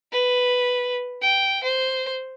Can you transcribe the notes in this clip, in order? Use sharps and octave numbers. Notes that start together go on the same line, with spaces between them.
B4
G5
C5